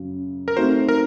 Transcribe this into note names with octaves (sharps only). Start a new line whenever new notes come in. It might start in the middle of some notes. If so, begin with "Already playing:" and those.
Already playing: F#2 C#3 F#3
A#4
A3 C4 D#4 F#4 C5
A#4